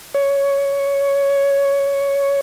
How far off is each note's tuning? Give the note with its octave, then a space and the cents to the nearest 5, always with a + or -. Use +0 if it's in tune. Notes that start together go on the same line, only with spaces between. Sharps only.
C#5 +10